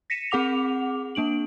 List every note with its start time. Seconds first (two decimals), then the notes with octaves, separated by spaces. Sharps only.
0.10 A#6 B6 C#7 D#7 E7
0.31 C4 G#4 F#5 D6 F7
1.15 A#3 D4 D7 F#7